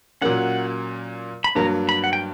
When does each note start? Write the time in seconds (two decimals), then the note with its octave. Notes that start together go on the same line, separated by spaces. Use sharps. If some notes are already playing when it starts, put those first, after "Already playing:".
0.21 A#2 F#3 A#3 C#4 F#5
1.44 B5
1.55 G2 F#3 A#3 A#5
1.89 B5
2.04 F#5
2.13 G5